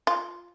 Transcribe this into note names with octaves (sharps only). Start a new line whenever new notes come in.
F4